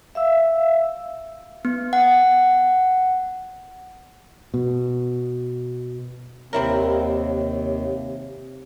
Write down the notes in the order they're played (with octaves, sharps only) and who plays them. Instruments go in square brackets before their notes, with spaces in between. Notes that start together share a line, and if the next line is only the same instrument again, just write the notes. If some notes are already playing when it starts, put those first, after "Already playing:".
[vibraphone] E5 F5 E6
[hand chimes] B3
F#5
[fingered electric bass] B2
[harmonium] D#2 [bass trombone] C3 [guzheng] C4 E4 A#4 [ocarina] C#5